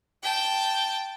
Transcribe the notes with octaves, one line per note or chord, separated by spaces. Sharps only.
G5 A5